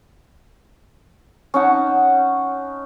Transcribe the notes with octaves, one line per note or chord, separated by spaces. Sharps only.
C#4 D#4 F#5 A5